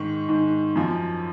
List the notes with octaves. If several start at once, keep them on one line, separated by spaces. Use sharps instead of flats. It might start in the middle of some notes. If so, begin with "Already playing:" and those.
Already playing: G#2 D#3 C#6
G#2 D#3
F#2 F3